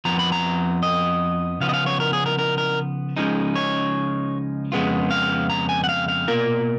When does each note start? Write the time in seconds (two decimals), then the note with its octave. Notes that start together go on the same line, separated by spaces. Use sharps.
0.05 F2 F3 B3 A#5
0.19 B5
0.32 A#5
0.83 D#5
1.60 C#3 F3 B3 F5
1.69 D#5
1.74 F5
1.86 C#5
2.00 A#4
2.13 G#4
2.26 A#4
2.39 A#4
2.58 A#4
3.17 C#2 C#3 F3 G#3 D#4
3.55 C#5
4.72 F2 C#3 G#3 B3 F4
5.11 F5
5.50 A#5
5.69 G#5
5.84 F#5
5.89 F5
6.08 F5
6.28 B2 A#3 F4 A#4